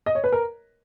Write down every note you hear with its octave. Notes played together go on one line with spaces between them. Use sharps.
D#5
C#5
B4
A#4